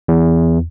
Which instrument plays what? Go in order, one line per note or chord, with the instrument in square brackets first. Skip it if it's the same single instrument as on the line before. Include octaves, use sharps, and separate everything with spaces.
[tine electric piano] E2